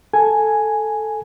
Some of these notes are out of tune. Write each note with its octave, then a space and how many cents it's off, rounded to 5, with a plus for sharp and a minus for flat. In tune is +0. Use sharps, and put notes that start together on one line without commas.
A4 +0 G#5 +0